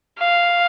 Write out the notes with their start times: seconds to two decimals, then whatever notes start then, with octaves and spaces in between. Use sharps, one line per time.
0.19 F5